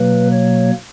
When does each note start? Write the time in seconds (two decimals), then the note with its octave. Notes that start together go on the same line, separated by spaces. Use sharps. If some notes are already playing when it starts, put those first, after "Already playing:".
Already playing: B2 F#3 A#3 B4
0.32 C#5